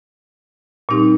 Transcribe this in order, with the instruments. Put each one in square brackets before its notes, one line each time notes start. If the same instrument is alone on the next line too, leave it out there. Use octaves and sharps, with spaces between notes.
[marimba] A#2 G3 C4 D#4 G4